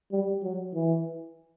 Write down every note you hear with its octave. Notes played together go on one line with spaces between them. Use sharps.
G3
F#3
E3